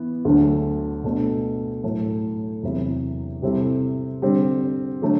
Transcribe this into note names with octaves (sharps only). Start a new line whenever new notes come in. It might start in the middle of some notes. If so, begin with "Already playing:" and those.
Already playing: E3 B3
D2 D3 F#3 A3
B2 A3 D4
A2 F#3 A3
E2 C3 F#3 C4 E4
C3 G3 C4 E4 A4
D3 G3 C4
D3 F#3 A3